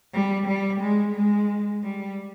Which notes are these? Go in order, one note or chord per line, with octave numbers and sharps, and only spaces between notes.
G3
G3
G#3
G#3
G3